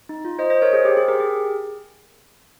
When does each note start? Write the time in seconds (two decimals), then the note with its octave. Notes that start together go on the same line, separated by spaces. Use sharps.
0.09 D#4
0.25 F4
0.39 C5 D#5
0.50 C5 D#5
0.62 A#4 C#5
0.73 G#4 C5
0.85 G4
0.97 G#4
1.08 G4 A#4
1.20 G#4